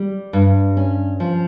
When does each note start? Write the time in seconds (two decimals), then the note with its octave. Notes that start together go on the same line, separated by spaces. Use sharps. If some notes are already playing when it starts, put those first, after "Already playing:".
Already playing: G3
0.33 G2
0.77 C#4
1.20 F3